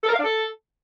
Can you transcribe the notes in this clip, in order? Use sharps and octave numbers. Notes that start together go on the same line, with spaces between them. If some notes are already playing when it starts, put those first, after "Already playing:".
A4
A#4
F5
D4
A4